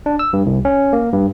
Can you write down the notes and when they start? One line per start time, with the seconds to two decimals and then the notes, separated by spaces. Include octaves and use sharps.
0.06 D4
0.19 E6
0.33 G2
0.46 C2
0.65 C#4
0.93 A#3
1.13 G2